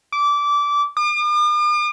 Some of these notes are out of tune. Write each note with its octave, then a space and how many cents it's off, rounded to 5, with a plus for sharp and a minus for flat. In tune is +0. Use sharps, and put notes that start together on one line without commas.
D6 -20
D6 +45